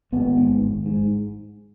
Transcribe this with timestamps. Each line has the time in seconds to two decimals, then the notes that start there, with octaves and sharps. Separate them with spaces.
0.12 G#1 B3
0.37 G#2
0.62 G#1
0.86 G#2